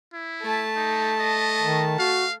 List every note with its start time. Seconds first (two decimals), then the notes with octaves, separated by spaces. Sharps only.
0.13 E4
0.42 A3 A5
0.76 D#4
1.19 D#5
1.62 D#3
1.99 F#4 F5